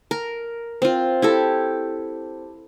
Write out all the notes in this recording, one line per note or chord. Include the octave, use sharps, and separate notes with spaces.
A#4
C4 F4
E4 G4 A4